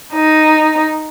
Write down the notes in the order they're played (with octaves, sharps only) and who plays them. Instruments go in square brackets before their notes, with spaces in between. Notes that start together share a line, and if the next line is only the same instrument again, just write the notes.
[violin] D#4